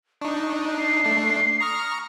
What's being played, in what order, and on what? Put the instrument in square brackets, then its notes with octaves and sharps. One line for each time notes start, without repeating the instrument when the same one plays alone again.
[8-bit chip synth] D4 D#4 [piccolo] C#6
[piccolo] F#6
C7
[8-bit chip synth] A3 D4
[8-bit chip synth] A#5 C#6 F6 [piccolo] D#6